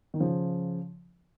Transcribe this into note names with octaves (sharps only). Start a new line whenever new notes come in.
D#3
C#3 F3